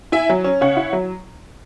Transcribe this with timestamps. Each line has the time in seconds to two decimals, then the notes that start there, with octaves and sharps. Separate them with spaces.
0.12 E4 E5 G#5
0.29 F#3
0.44 C#4
0.61 C#3 C#5 F#5
0.77 E4
0.93 F#3